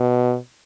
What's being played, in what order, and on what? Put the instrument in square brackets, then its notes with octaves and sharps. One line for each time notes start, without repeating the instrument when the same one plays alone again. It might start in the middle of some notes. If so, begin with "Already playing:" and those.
Already playing: [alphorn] B2